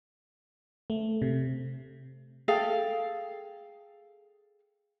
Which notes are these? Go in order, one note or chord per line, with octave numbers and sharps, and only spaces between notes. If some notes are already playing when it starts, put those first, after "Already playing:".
A3
C3
G#4 A4 F5 G5